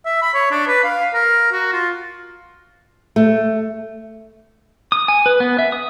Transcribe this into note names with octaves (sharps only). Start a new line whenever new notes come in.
E5
B5
C#5
D4
B4
F5
A#4
F#4
F4
A3
D#6
G#5
B4
B3
E5
D#6